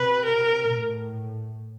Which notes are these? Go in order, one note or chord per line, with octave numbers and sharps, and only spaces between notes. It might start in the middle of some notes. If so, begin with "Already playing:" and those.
Already playing: C3 B4
A#4
A2